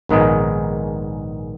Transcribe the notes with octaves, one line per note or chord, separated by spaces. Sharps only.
A#1 G#2 D#3 G#3 B3